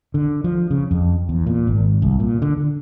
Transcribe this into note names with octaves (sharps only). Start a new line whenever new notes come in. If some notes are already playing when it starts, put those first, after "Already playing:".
D3
F3
C#3
F2
E2
A#2
G#1
C2
A#2
D3
D3